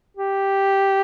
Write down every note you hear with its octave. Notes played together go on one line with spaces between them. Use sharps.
G4